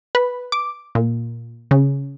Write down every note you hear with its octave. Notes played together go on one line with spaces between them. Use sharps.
B4
D6
A#2
C#3